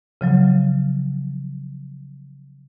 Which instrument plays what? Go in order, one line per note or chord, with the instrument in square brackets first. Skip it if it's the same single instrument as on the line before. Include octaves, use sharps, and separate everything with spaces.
[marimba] C#3 F3 F#3